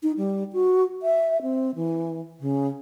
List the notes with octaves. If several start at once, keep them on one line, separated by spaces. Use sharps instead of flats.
D#4
G3
F#4
E5
C4
E3
C#3